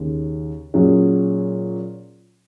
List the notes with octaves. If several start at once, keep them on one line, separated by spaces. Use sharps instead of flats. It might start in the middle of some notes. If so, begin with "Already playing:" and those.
Already playing: D#2 C#3 C#4
A#2 F#3 C#4 G#4